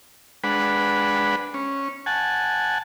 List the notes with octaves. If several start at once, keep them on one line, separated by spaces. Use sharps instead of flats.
G#3 D4 B4 F#5 B5
C#4
F#5 G#5 A5